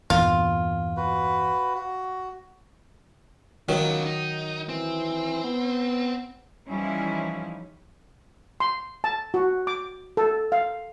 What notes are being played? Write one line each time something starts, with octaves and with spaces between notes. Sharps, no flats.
E2 G2 A#2 F4
F#4 B4
F#4
D#3 F#3 C#4 F4
D#4
E3 C4
B3
E3 F3 G3 C#4 D#4 E4
C6
A5
F#4
D6
A4
F5